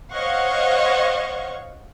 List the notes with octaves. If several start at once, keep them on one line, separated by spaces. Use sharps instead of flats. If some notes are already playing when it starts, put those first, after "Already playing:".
C5 C#5 D#5 F5 F#5 C#6